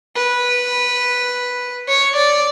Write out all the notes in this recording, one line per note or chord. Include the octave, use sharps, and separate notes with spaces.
B4
C#5
D5